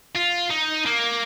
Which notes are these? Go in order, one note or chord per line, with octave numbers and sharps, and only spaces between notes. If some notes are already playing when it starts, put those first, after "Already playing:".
F4
D#4
A#3